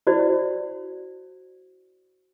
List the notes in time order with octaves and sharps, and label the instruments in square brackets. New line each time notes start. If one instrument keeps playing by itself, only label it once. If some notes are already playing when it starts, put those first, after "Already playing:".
[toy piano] E4 F#4 C5 D5